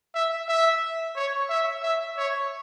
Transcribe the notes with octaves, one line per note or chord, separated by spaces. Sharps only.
E5
E5
C#5
E5
E5
C#5